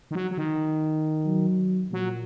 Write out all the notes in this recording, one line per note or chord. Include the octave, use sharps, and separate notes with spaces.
D#3
F#3
F#3
D#3
F#3
A#2 F#3